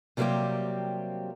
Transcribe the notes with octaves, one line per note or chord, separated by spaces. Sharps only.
C3 F#3 G3 A#3 C4 G4